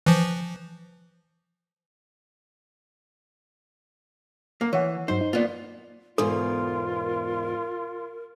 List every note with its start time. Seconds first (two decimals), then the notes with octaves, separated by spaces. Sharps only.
0.06 E3 F3
4.61 A#3
4.73 E3 C#5 F#5
5.08 G2 F#3 D#4 C5
5.21 D#4
5.33 A#3 B3 F4 D5
6.18 E2 G#2 B2 F4 A4 A#4